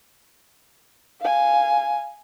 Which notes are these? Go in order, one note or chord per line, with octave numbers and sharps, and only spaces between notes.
F5 G#5